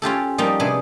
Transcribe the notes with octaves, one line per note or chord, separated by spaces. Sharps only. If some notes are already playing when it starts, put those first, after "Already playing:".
C#4 F4 G4 A4
F3 G3 A#3 D#4
C3 D4 G#4 B4